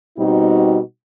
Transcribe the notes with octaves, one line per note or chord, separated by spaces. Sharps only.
B2 G3 C4 D#4 F#4